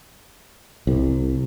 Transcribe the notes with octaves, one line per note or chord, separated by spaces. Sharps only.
C2